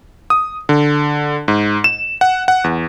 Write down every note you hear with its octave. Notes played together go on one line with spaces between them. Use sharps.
D#6
D3
G#2
E7
F#5
F#5
E2